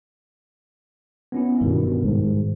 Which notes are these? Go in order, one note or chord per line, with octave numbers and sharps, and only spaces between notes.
B3 C#4 E4
G2 B2 D#3 G3
G#2